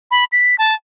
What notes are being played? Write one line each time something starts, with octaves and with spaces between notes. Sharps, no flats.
B5
B6
A5